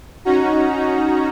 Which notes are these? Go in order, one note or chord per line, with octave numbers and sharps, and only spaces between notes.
C#4 D#4 F#4 A#5